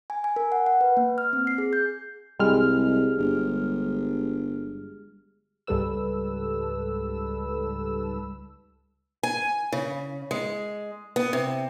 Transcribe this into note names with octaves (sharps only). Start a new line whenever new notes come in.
G#5
G#5
A#4
F#5
F#5
B4
A#3
F6
C4
C7
G#4
G6
C2 G3 G#3 F6
G1
C#2 G#2 G3 A4 B4 E6
G#5
C#3
G#3
B3
C3